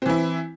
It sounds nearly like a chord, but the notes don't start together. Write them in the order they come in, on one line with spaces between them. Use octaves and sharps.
C4 E3 E4